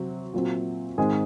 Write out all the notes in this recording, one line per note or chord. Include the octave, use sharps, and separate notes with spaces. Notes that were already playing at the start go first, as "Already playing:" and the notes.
Already playing: C3 F#3 C4
A#2 F#3 C4
G#2 D#3 G#3 C4 G#4